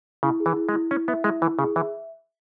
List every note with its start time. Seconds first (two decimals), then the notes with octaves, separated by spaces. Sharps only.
0.23 C#3 E4
0.40 G#4
0.46 E3
0.57 E4
0.69 G#3
0.73 E4
0.91 C#4 E4
1.08 B3 E5
1.24 G#3 E4
1.41 E3 E4
1.59 C#3 G#4
1.76 E3 E5